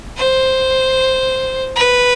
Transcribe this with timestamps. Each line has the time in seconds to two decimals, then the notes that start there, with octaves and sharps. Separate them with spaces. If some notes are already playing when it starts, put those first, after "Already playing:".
0.17 C5
1.76 B4